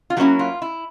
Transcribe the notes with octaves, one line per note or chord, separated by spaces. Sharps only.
F4
F#3 A#3 C#4 E4 F#4
F4
E4